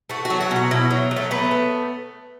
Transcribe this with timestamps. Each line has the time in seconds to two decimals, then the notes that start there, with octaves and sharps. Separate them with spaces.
0.09 A3 F#4
0.25 F#4
0.30 F#3
0.41 F#4
0.51 B2 F#4
0.71 B2 E4
0.90 F#3
1.11 F#3
1.16 A3
1.31 A3 B3
1.51 A3